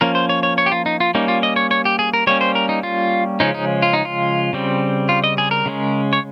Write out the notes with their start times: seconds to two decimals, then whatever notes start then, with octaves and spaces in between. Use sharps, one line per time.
0.01 F3 A#3 C#4 A#4
0.15 C5
0.29 C#5
0.43 C#5
0.58 C#5
0.66 G4
0.72 F4
0.86 D#4
1.00 F4
1.15 G3 A#3 C#4 D#4
1.28 F4
1.43 D#5
1.56 C#5
1.71 C#5
1.85 G4
1.99 G#4
2.14 A#4
2.27 G3 A#3 C#4 C#5
2.41 C5
2.55 A#4
2.69 D#4
2.83 F4
3.40 C#3 F3 G#3 C#4 D#4
3.54 D#4
3.82 F4
3.93 D#4
4.05 F4
4.53 C#3 G3 C4
5.09 F4
5.24 D#5
5.38 G#4
5.51 A#4
5.66 C#3 G#3 C#4
6.13 C#5